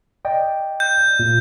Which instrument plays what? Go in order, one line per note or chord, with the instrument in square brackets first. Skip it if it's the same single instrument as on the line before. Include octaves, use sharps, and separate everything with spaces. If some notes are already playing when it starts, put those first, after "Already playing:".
[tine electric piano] D5 D#5 G5
[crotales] G6
[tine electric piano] A#2